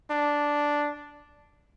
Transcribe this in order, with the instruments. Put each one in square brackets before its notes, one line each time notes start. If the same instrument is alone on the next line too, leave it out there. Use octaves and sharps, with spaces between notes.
[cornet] D4